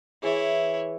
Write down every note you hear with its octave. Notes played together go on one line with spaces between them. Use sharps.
E3 E4 G#4 C#5 E5